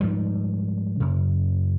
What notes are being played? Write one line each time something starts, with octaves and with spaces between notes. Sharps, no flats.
G#2 F3 G3
F#2 C#3